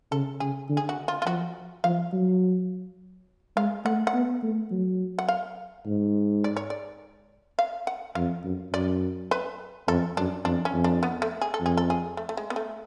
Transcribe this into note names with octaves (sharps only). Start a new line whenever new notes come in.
C#3 A4
C#3 G#4
D3
G#4
F#4
F4
F4
F3 F#4
F3 F5
F#3
G#3 F5
A3 F#5
F#5
B3
A3
F#3
F#5
F5
G#2
D5
C#5
D5
F5
F#5
F2 F5
F#2
F#2 D5
B4
F2 A4
F#2 D4
F2 D4
C#4
F2
D4
B3
A3
G#4
A4
F2 G#4
A4
G#4
A3
A3
G#3
B3
A3